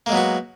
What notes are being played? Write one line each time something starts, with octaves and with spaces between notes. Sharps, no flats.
F#3 G#3 A#3 B3 F#4